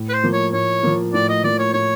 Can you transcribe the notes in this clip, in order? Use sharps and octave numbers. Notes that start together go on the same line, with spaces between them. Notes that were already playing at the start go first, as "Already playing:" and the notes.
Already playing: A2
B4
C5
F3 A#3
C#5
A2 C#5
F3 A#3
A2 D5
D#5
F3 A#3 D5
C#5
A2 C#5